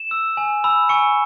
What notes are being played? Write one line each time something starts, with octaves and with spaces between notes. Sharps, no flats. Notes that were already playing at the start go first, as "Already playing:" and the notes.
Already playing: E7
E6
G#5
B5 E6
G#5 C#6 C#7